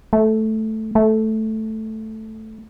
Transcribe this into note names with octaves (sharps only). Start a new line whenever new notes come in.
A3
A3